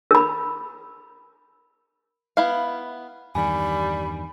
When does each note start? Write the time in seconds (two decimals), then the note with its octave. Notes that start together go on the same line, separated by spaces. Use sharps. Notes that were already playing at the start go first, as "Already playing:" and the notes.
0.11 A#4 B5
2.37 B3 E4 F5
3.35 E2 G2 D#3 G3 G#5 B5